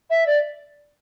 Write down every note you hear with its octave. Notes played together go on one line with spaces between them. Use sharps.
E5
D5